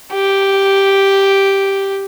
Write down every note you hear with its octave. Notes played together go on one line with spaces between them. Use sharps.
G4